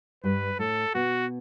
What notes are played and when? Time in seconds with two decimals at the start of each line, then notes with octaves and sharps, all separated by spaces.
0.24 G2 G3 B4
0.59 A2 A3 A4
0.94 B2 B3 F#4